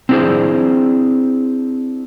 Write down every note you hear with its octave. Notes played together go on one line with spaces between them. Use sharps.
C4 D4 E4 F#4 G#4 C5